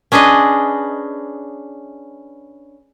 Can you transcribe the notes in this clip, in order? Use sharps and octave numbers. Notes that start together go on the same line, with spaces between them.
C#4 D4 G#4 B4 D#5